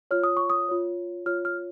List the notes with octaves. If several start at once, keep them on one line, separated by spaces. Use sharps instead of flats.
F4 C#5 F6
D#6
C#6
D#6
F4 C#5
F4 C#5 F6
F6